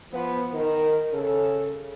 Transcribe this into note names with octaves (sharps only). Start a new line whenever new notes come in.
F3 B3
D#3 A#4
C#3 A4